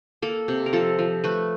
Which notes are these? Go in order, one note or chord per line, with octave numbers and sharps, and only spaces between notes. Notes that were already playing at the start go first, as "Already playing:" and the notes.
A#3 A4
C3
A#4
F3 A4
F3
A3 B4